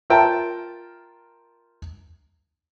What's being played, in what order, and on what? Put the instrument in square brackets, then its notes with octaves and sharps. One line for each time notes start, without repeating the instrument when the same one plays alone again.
[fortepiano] F4 A#4 E5 G5 A5 A#5